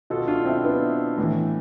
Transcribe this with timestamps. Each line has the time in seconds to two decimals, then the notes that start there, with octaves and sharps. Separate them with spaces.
0.10 B2 F4 A4
0.28 D4 F4
0.45 C4 E4
0.64 B3 D4
1.18 A2 E3